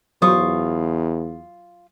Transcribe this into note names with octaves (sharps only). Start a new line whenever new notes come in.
E2 F#3 F4 C5 C#6 D#6